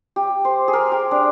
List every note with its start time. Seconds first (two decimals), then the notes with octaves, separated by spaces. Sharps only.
0.16 G4
0.45 C5
0.68 G#4
0.73 A#4
0.92 G4
1.11 D4